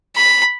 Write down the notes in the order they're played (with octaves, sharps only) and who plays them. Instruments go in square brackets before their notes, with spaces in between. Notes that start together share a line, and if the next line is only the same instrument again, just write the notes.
[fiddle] B5